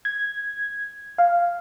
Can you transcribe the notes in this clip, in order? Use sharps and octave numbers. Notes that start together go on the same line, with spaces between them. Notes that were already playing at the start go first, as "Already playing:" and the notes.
G#6
F5